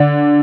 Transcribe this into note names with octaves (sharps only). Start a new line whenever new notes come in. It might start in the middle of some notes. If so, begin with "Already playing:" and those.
Already playing: D3 D5